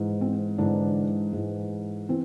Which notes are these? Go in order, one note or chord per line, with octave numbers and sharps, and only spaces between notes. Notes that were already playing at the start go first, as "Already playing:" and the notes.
Already playing: G#2 E3
C4
G#2 D3 E3 D4
G#2 E3
E3 C4